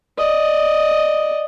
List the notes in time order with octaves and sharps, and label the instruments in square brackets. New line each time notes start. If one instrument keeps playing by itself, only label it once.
[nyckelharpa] D5 D#5